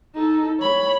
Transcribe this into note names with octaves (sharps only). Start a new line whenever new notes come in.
D#4 A4
C#5 B5